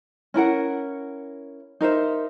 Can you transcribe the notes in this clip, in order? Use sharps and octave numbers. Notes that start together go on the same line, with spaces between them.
C#4 E4 A#4 F#5
D#4 A#4 C5 E5